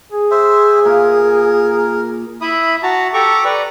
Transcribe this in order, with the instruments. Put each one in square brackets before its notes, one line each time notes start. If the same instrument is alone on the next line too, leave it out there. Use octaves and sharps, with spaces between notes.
[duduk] G#4
[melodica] C5 E5
[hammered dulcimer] A#2 [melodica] A#4
[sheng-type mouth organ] E4 E5 B5 D#6
F#4 A5 A#5
G4 A4 A#5 C#6 D6
B4 D5 A#5